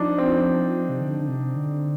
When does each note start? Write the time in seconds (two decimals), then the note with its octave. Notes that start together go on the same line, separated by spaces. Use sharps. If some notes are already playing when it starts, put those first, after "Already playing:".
Already playing: F3 D4 D#4
0.18 C4
0.89 C3
1.01 D3
1.21 D3
1.28 C3
1.56 D3